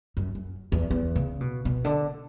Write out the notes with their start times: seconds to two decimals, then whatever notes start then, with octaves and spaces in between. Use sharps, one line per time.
0.17 F#2
0.35 F#2
0.72 E2
0.91 E2
1.16 C#3
1.41 B2
1.65 B2
1.85 D3